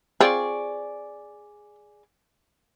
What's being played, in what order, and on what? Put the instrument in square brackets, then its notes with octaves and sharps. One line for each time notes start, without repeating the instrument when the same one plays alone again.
[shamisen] C4 F4 [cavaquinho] G#4 D5 C#6